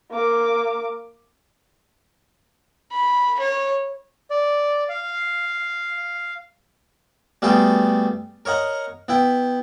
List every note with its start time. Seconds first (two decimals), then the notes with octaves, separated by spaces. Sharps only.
0.12 A#3 D6
2.92 B5
3.39 C#5
4.31 D5
4.89 F5
7.42 G3 A3 B3 F#4 G#4 G5
8.45 A#4 C#5 D#5 F#5 A#5
9.08 B3 E4 G5